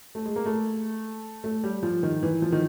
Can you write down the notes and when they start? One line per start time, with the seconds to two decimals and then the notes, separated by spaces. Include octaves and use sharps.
0.15 A3
0.25 G#3
0.36 A#3
0.46 A3
1.44 A3
1.64 G3
1.83 F3
2.03 D#3
2.23 E3
2.42 F3
2.52 D#3